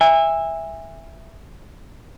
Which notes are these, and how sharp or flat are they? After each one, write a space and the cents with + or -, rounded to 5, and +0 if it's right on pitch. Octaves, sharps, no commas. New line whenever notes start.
E5 +0 G#5 -30